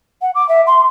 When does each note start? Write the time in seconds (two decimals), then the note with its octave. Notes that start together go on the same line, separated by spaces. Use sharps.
0.22 F#5
0.35 D6
0.49 E5
0.67 C6